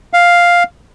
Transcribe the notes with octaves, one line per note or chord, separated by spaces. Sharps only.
F5